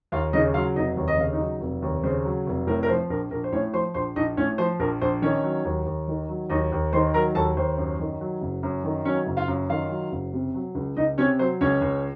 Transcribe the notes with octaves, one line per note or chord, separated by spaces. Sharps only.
D#2 F4 F5
C#3 D#4 D#5
F#3 F4 F5
F1 D#4 D#5
D#2
D#5
C#3 F5
D#4 D#5
F#3
F1
D#2
C#3 C5
F#3
F1
A2 A#4
A#4
F3 C5
A#1 A#4
A#1 A#4
C5
A2 C#4 C#5
F3 C5 C6
A#1 C5 C6
A#1 D#4 D#5
A2 C#4 C#5
F3 C5
A#1 A#4
A#1 C5
D#3 C#4 C#5
F#3
D#2
D#2
D#3
F#3
D#2 D#4 D#5
D#2
D#3 C5 C6
F#3 A#4 A#5
D#2 A4 A5
D#2 C5
F#2
D#3
F#3
F#1
F#2
D#3
F#3 C#4 C#5
F#1
F4 F5
F#2
D#3 F4 F5
F#3
F#1
C3
F#3
C#2
C#2 D#4 D#5
C3 C#4 C#5
F#3 C5
C#2 C#4 C#5
C#2